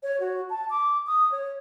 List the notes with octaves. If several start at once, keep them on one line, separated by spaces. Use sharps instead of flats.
C#5
F#4
A5
D6
D#6
C#5